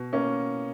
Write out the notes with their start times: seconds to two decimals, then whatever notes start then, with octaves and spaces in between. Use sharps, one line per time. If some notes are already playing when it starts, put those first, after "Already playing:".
Already playing: B2
0.13 A#3 C#4